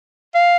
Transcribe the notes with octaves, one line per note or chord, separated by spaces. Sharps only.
F5